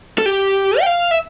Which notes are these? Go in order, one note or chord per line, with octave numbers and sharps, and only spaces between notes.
A4
G4
G5
F5
E5